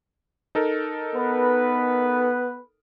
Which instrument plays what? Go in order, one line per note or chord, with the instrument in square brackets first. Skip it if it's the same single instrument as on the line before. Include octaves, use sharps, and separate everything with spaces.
[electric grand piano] D#4 A4 A#4
[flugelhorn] B3 [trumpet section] B4